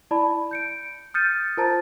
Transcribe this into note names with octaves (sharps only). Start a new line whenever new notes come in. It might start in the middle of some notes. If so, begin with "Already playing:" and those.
E4 D5 A5 B5
G6 C#7 D7
D#6 F6 G6 A6 C#7 D#7
F4 A#4 C5 A5 A#5 A6